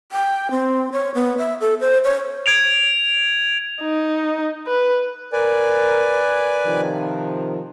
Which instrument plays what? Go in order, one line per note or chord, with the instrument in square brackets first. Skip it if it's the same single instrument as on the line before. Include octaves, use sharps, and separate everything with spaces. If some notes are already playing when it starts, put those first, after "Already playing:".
[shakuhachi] G5
C4
C#5
B3
E5
A4
C5
C#5
[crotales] G#6 D7 F7
[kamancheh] D#4
B4
[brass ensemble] A#4 [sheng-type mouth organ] B4 D5 G#5
[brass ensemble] C3 D#3 F3